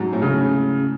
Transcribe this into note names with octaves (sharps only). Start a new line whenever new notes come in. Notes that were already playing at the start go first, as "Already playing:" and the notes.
Already playing: G#2 F#3
A2
C#3